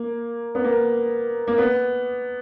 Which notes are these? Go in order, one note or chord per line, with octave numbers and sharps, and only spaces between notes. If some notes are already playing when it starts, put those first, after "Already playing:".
Already playing: A#3
B3
A#3
A#3
B3